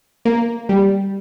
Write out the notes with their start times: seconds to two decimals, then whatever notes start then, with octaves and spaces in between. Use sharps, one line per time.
0.25 A#3
0.69 G3